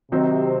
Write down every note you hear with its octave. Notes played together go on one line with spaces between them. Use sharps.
C3 D#3 F#3 C4 D#4